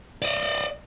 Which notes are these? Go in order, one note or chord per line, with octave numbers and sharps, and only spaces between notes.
D5 D#5